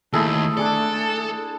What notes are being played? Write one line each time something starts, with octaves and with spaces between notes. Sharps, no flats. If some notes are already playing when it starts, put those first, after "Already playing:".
D#2 A3 E4 G#4 A4
D4 G#4 A4 D5